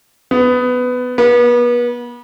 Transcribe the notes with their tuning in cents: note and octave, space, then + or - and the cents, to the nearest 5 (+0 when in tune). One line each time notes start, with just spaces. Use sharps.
B3 +15
B3 -35